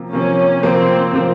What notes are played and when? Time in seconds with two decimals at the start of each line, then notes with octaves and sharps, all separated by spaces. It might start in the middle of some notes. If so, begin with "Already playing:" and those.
Already playing: C3 F3 A#3
0.13 C3 F3 A#3 C#4
0.63 C3 F3 A#3 C4
1.13 C3 F3 A#3